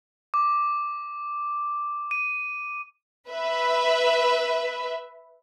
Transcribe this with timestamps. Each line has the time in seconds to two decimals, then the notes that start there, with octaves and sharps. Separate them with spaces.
0.34 D6
2.11 D#7
3.30 B4 E5